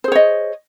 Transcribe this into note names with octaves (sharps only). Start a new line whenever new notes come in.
G#4 C5 C#5 D#5